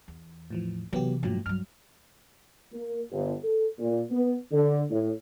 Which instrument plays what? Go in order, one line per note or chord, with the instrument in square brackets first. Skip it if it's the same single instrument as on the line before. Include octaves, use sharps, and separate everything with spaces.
[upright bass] E2
[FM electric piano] A2 E3 F3
[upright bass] C3 E3 [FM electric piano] F#3 B3 G4
[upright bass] G2 A3 [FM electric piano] A#2 F3 F#3
[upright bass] G2 F#3 [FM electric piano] F6
[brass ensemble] A#3
G1
A4
A#2
B3
D3
A2